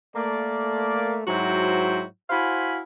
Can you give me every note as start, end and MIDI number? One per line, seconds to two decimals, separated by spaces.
0.16 1.21 57
0.16 1.21 58
0.16 1.21 74
1.28 2.04 44
1.28 2.04 54
1.28 2.04 64
1.28 2.04 66
1.28 2.04 72
1.28 2.04 79
2.30 2.81 64
2.30 2.81 66
2.30 2.81 72
2.30 2.81 77
2.30 2.81 80
2.30 2.81 83